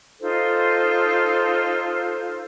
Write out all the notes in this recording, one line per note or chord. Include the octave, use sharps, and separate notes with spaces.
D#4 F4 A4 C5